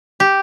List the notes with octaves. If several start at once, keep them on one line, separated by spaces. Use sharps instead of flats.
G4